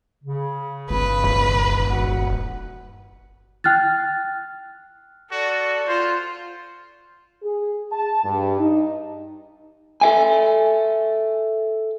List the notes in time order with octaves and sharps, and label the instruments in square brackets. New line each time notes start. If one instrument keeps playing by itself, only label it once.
[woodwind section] C#3
[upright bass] G1 C4 [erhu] B4
[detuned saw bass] D#1
[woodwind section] F#4 F#5
[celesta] G5 F6 F#6 A6
[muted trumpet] F#4 [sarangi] A4 [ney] D5
[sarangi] F4 [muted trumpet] C5
[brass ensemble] G#4
A5
G2
D#4
[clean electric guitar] A4 E5 G#5